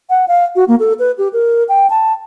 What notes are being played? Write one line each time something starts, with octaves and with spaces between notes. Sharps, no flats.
F#5
F5
F#4
A#3
A4
B4
G4
A#4
G5
A5